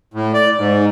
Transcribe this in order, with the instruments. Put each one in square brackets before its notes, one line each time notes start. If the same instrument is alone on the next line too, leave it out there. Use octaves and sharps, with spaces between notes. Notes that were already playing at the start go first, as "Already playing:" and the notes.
[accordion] A2
D5
G#2